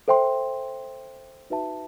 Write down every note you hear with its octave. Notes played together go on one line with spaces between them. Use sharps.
A4 C5 E5 G5 C6
D#4 F#4 B4 E5 A5